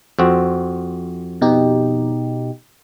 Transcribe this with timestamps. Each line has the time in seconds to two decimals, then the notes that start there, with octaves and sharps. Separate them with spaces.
0.19 F2 C4 F#4
1.41 B2 D#4 G4